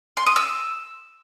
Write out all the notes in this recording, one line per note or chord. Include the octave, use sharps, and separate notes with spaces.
C6
D#6
E6